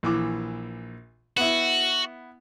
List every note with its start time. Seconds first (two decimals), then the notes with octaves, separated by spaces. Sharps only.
0.03 A#1 E3 D6
1.37 B3 E4 F#4